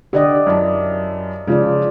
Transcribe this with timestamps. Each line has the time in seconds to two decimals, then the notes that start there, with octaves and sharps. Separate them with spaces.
0.13 D3 G4 D5 D#5
0.47 F#2 E4 A5
1.47 C#3 F3 G#3 F4 D5